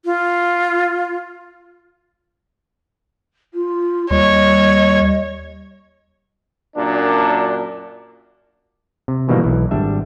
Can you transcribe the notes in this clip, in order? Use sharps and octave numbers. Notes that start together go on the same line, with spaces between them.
F4
F4
D#2 G3 C#5 D#5
F#2 A#2 D4
C3
G#2 B2 D#3 E3 G3 A#3
B1 E3
G#1 G3 D4 E5